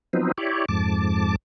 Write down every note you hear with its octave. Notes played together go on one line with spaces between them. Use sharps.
F3 F#3 B3 C4 D#4
E4 G4 C#5 D5
F2 G#2 A5 D6